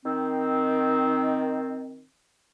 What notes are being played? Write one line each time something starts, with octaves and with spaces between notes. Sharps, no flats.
D#3 C4